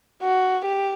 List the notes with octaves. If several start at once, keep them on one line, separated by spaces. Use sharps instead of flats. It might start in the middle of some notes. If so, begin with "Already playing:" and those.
F#4
G4